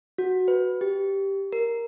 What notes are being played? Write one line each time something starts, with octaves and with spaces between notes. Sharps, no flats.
F#4
B4
G4
A#4